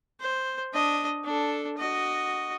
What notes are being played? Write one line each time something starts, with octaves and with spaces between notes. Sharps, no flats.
C5
D4 D#5
D4 A4
F#4 D#5